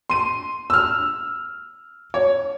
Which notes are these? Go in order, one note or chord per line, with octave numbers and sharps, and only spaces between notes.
C6 D#7
E6 F6
C#5